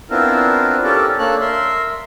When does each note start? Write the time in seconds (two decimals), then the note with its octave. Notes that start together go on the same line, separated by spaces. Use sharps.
0.10 B3 C4 D4 E4 F4 A#4
0.84 C#4 G4 A4 A#4 D5
1.19 A#3 D4 A4 C#5 F#6
1.41 A#4 E5 C6